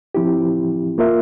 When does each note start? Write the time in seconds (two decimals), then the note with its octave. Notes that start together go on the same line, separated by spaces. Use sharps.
0.15 F3 C4 E4 G4
0.98 A#3 F4 A#4 E5